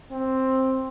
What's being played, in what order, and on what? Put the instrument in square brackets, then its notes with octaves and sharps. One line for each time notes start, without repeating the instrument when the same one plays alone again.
[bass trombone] C4